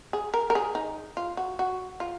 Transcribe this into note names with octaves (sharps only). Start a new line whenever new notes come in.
G#4
A#4
A#4
G#4
D#4
F4
F#4
F#4
F4